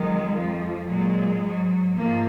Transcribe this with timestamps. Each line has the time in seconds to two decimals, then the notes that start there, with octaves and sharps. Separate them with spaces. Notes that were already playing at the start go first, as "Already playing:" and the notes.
Already playing: F2 D#3 F#3 G#3
0.33 F2 F3
0.88 A#2 F#3 G#3
1.42 G#2 F#3
1.96 G#2 F3 A#3